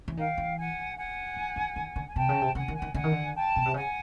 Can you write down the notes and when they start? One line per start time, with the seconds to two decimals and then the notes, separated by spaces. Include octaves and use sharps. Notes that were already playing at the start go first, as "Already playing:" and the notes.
0.08 E3
0.17 D#3 F5 G5
0.38 E3
0.57 F#5 G#5
0.97 F#5 G#5
1.36 D#3
1.56 D#3
1.76 D#3
1.96 D3
2.06 G#5
2.15 C3 G5 A5
2.29 C#3
2.41 C3
2.55 C#3 F#5 G#5
2.68 D#3
2.75 F#5 G#5
2.82 D#3
2.94 D3 F#5 G#5
3.04 D#3
3.12 D3
3.34 G5 A5
3.56 B2
3.65 C3
3.74 C#3 F#5 G#5